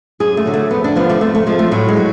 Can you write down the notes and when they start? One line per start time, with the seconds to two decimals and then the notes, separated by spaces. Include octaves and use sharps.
0.20 F#2 G#4
0.37 A3
0.46 D3 F#3
0.54 A3
0.71 F2 B3
0.84 D4
0.96 D3 F3 B3
1.09 A3
1.21 F2 A3
1.35 A3
1.46 F3 G#3
1.59 A3
1.71 A2 F#3
1.88 G#3
1.97 F#3